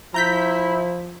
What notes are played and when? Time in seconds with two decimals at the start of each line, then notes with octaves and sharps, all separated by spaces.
0.14 F3 E4 A#5 G6 B6